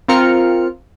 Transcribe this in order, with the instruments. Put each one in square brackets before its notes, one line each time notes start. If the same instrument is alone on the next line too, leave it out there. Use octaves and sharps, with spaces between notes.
[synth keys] C4 F4 A#4 F6 C#7